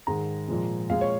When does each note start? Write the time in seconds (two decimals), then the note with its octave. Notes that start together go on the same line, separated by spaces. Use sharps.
0.07 G#2 D#3 G#3 A#5
0.49 A#2 F3 G#3
0.90 A#2 G#3 F5
1.01 C#5